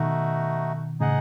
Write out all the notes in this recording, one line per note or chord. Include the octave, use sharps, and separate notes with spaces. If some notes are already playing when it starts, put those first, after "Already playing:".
Already playing: B2 D#3 A3 D#4 F#4
A2 C#3 D#4 G#4 D#5 F#5